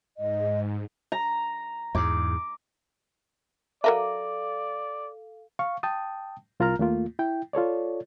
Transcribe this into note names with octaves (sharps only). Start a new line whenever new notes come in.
G#2 D#5
A#5
E2 G#2 D6
F#3 A4 A#4 D5 E5 F5
F5 C#6
G5 A5 D#6
C2 F4 A#4 A#5 F6
D#2 A3 A#3 F4
E4 G5
F4 A4 C#5 D5